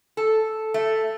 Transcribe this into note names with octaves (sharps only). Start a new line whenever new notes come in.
A4
A3